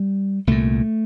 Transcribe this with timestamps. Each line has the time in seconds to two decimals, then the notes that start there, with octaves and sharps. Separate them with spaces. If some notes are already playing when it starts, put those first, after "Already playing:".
Already playing: G3
0.47 C2 A#2 A3